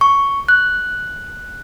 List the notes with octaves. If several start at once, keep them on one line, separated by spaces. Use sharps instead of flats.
C#6
F#6